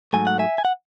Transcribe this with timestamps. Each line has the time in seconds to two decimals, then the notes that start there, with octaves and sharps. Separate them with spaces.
0.13 G#2 F#3 A3 G#5
0.27 F#5
0.39 E5 G#5
0.58 G#5
0.65 F#5